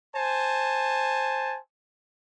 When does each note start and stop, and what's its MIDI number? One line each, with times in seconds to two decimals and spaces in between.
0.16 1.58 72
0.16 1.58 80
0.16 1.58 81